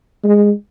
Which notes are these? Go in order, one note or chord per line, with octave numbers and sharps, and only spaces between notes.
G#3